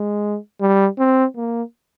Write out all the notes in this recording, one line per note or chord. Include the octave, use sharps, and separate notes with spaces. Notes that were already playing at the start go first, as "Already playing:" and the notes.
Already playing: G#3
G3
C4
A#3